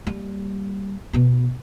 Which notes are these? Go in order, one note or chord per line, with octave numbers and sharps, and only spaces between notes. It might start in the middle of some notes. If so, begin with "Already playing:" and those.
G3 A#3
B2 B3